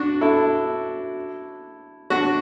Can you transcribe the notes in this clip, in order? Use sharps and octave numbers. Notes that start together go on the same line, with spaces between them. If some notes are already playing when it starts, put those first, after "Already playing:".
Already playing: D4 F#4
E4 A4
D4 F#4